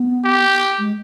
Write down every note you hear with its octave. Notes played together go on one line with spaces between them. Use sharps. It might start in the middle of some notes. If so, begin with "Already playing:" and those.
Already playing: B3
G4
G#3